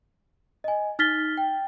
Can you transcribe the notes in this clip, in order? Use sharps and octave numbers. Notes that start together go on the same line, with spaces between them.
D#5 G#5
D#4 F6 A6 B6 G7
G5